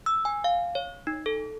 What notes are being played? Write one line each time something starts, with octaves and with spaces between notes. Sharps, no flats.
E6
G#5
F5
C#5
D#4
A4